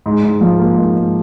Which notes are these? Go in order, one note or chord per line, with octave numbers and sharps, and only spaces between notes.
G#2
G#2
F3
A#3
G#2
G#2